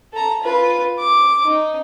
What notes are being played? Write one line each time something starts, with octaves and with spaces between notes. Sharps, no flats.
A4 A#5
F4 B4
D6
D#4